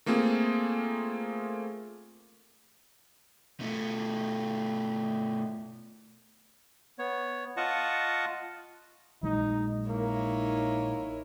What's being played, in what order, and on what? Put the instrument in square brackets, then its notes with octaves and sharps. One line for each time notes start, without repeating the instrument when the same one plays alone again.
[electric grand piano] A3 A#3 C4 F4 G#4
[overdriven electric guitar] B2 A3
[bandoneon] B3 C#5
F4 D#5 F#5 A5 C#6
[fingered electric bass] A#1 F#3 G#3 [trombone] D#4
[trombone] A#3 [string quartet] D#4 E4 C#5